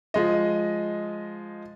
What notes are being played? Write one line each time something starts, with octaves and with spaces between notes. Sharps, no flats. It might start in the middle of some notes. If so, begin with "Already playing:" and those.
F3 G#3 D#5